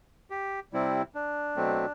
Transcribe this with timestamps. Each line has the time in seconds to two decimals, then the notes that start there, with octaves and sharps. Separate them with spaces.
0.30 G4
0.73 C3 G3 C4 E4
1.15 D4
1.56 B2 F#3 A3 C4